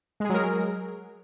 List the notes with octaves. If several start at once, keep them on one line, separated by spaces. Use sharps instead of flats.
F#3 G#3 G#4 A#4